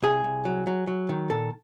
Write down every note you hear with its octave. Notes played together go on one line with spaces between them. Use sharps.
C2 G#4
C2
F#3
F#3
F#3
D#3
A#2 A4